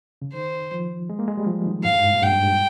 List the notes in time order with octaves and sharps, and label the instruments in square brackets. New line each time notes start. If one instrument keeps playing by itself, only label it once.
[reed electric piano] C#3
[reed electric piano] D#3 [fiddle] C5
[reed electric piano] F3
G#3
A#3
G#3
G3
F3
D#3
[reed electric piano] G#2 [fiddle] F5
[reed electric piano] G2
G#2
A#2
[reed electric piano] G2 [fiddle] G5
[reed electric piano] G2
G#2
A#2